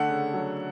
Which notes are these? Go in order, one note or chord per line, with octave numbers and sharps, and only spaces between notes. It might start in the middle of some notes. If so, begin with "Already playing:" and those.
Already playing: D3 A3 F#5
C#3
F#3